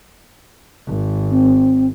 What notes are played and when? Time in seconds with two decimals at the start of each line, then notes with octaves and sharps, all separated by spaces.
0.87 G#1
1.30 C4